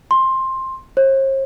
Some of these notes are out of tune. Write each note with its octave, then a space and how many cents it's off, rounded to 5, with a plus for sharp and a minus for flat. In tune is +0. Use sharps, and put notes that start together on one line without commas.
C6 +15
C5 +45